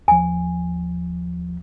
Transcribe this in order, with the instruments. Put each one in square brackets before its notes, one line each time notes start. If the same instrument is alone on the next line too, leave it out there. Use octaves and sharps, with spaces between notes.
[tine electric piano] D#2 F3 [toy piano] G#5